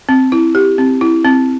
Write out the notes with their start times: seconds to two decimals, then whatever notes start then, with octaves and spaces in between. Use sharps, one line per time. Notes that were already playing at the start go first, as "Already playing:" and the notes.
0.09 C4
0.32 E4
0.55 G4
0.78 C4
1.01 E4
1.25 C4